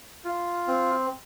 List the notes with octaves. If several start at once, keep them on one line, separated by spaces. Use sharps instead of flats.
F4
C4